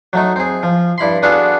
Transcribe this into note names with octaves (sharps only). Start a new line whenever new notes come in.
F#3 A3 D#4
C4 G#4
F3
G2 E4 B5 C6
B3 D4 F4 F#4 G#4 A4